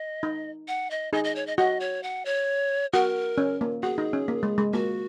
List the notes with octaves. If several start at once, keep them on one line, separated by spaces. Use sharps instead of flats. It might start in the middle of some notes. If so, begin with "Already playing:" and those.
Already playing: D#5
D#4
F#5
D#5
D#4 G#4 D#5
D#5
C#5
D#5
F#4 D#5
C#5
F#5
C#5
F#4 A#4
C#4
A#3
F#4 G#4
D#4
C#4
A#3
G#3
G#3
A#3 F#4